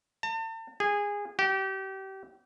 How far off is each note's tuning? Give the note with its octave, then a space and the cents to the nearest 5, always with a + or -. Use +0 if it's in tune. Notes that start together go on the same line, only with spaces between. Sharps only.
A5 +40
G#4 -20
G4 -30